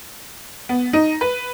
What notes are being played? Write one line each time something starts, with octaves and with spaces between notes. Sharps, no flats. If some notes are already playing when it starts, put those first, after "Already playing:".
B3
D#4
B4